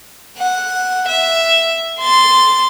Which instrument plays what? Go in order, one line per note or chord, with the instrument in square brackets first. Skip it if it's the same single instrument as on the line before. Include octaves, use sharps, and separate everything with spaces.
[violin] F#5
E5
C6 A6